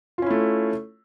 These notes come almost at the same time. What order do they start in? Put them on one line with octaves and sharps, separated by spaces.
F4 C#4 E4 A3